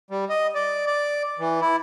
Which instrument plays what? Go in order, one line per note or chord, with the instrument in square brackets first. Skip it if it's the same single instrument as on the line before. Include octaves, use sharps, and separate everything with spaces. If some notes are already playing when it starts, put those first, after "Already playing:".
[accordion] G3
D#5
D5
D5
E3
E4